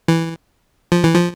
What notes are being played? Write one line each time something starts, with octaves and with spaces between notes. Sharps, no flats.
E3
F3
E3
F3